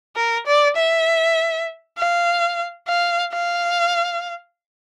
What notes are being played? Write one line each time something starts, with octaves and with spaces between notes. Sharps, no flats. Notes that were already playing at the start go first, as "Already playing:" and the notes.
A#4
D5
E5
F5
F5
F5